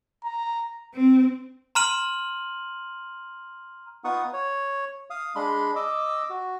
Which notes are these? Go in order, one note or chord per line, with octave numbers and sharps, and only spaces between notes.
A#5
C4
A#5 C6 F6 D#7 F#7
B3 D#4 F4 F#5 C#6 D#6
C#5
F5 D#6
G#3 D4 B5 C6
D#5 D6 E6
F#4